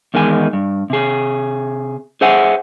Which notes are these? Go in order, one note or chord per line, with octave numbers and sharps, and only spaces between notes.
E2 D#3 G#3 G#5
G2
C3 G#4
G#4 C5 E5 F#5 G#5